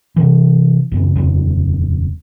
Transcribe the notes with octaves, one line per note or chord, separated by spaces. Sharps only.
C3 E3
C2 F#2 C#3
D#1 F2 C#3